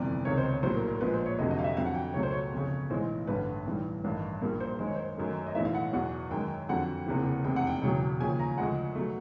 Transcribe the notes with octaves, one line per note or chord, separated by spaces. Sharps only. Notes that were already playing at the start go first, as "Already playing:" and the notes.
Already playing: G1 F2 C3 E3 G3 D5
C#2 C3 D#3 C#5
C5
C#5
A#1 A2 F#3 C5
A#4
A#4
A#1 A#2 F3 G#3 B4
C5
C#5
F1 F2 D3 F#3 D#5
D#5
F5
E5
F2 D3 F#3 F5
F#5
G5
C#2 B2 F#3 A3 C#5
C5
C#5
G1 F2 C#3
B1 A2 E3 G#3 C5
A1 G2 D3 G3 B4
B1 A2 E3 G3
A1 G2 D#3
A#1 A#2 G3 A#4
C5
F#2 D#3 G#3 C5
C#5
C5
F#2 D#3 F#3 A3
D#5
B1 A2 E3 A3 E5
F5
F#5
E2 B2 F#3 F#5
F#2 D#3 G#3 G5
F2 D3 F#3 F#5
F#1 E2 C3 E3
F1 E2 C3 G5
F#5
G5
E1 E2 C#3 F#3
D#2 C#3 F3 G#5
A#5
D2 C#3 F3 G#3 F#5
B2 F#3 A3